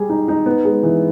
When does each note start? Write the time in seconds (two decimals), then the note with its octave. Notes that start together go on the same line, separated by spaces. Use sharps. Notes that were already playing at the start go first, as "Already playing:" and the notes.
Already playing: G3 G#4
0.10 D#4
0.28 D#4
0.46 B3
0.65 G#3
0.83 E3